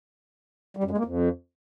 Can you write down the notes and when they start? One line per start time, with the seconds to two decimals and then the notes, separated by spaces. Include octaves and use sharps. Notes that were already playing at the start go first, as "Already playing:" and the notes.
0.77 G3
0.84 F#2
0.91 G#3
0.98 A#3
1.05 F2